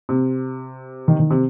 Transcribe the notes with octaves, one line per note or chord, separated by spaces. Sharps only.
C3
D#3
D#3
C3